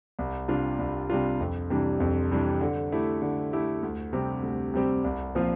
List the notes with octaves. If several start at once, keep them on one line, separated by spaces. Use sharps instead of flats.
C2
C3 G3 D4 F4
C2
C3 G3 D4 F4
F2
C3 E3 G3 D4
F2
C3 E3 G3 D4
D3
A3 E4 G4
D3
A3 E4 G4
D2
C3 G3 C4 G4
D2
C3 G3 C4 G4
C2
A#2 F3 C4 F4